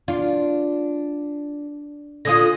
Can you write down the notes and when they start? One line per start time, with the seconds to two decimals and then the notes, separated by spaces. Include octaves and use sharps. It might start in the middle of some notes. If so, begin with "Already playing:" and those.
0.08 D4 F4
2.25 D3 C#4 F4 D#6 A#6